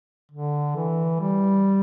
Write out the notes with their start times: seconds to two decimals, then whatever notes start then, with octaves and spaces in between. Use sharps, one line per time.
0.32 D3
0.76 E3
1.20 G3